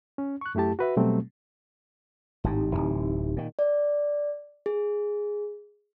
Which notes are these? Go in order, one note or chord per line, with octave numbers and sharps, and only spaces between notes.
C#4
C#6 F#6
F#2 A3 E4 G4 A5
F#4 B4 E5
B2 F#3 G3 A3 C4
G#1 A2 C4 D#4 G4
D1 B1 E3
A#2 D#3
D5
G#4